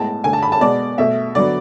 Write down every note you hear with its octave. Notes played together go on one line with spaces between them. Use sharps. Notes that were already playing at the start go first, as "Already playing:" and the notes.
Already playing: A2 G#3 B3 A5
D3 A3 G#5
A5
B5
A5
B2 G#3 B3 D5
B2 A3 E5
D3 F#3 B3 D5